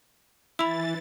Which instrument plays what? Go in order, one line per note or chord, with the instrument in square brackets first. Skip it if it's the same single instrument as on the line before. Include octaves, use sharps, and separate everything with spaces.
[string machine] E3 A6 [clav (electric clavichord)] E4 [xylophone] B5 E6